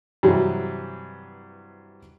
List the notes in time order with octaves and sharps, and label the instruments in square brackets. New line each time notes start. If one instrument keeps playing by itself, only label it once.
[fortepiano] G2 C3 E3 F#3 G3